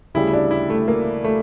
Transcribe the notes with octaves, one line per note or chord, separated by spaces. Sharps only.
D2 C#3 G3 E4
D4
E4
A3
A#3
A3